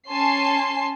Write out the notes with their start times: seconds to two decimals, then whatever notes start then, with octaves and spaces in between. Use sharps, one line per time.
0.10 C#4 G#5 A5 C6 C7